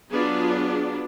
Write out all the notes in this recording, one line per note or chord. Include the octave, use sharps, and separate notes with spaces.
F#3 B3 D4 F4 G#4